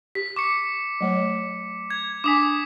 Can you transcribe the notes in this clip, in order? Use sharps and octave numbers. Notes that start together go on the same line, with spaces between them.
G4 B6
C#6 D6 C#7
F#3 A3 C#5
G#6
D4 G#5 D6 D#6 B6